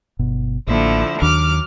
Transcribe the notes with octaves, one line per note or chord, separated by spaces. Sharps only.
G1 B2
A1 D3 F3 A#3 E4
D#2 D#3 F#3 D4 D6 F6